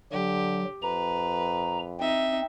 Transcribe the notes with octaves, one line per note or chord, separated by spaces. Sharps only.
D3 F#3 G4
F2 B4 A#5
C4 D#4 E5